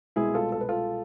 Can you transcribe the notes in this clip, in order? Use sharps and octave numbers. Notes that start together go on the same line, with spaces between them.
C2 B2 G#3 E4 G#4
F4 A4
A4
B4
F4 A4